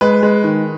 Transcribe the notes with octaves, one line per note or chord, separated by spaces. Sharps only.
G#3 B4
G#3
D#3